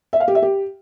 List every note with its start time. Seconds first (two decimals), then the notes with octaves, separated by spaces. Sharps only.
0.13 E5
0.20 F5
0.28 G4
0.35 E5
0.42 G4